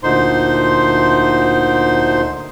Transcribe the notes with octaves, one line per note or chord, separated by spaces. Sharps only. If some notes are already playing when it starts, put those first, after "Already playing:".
D2 A#2 D3 D#4 C5 C6